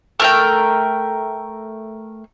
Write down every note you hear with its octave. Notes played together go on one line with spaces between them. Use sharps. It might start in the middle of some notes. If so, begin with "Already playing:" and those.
A3 A#4 G5